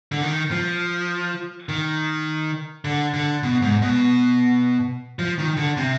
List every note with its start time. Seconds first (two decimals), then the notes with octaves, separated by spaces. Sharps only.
0.12 D3
0.22 D#3
0.51 F3
1.69 D#3
2.85 D3
3.14 D3
3.43 B2
3.62 G#2
3.82 B2
5.19 F3
5.39 D#3
5.57 D3
5.77 C3